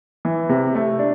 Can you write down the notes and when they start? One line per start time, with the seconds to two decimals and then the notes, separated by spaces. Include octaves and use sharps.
0.25 E3
0.49 C3
0.75 A3
0.99 D4